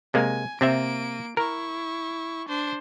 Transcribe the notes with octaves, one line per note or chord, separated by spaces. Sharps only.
C3 G#3 A#3 G#5
C3 A#3 C4 E5 D7
E4 A#4 C#6
D4 C5